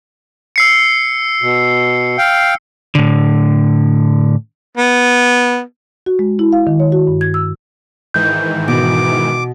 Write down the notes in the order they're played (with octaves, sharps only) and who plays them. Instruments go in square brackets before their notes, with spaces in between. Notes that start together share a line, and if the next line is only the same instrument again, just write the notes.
[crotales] E6 C7 C#7
[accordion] B2
F5 G5
[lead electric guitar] A2 D3
[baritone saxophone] B3
[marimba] F#4
G#3
E4
F5
D#3
C#5
F#4
G2
G#6
E6
[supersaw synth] G#2 D#3 E3 [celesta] G6
[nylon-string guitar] B2 [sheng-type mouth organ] D6